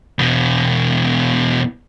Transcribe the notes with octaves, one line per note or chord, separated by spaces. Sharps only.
E2 B2